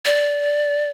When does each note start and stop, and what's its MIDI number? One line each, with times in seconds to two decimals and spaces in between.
0.05 0.90 74